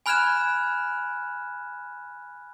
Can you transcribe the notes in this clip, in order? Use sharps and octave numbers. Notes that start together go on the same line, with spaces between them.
G#5 B5 F6 F#6 G#6 E7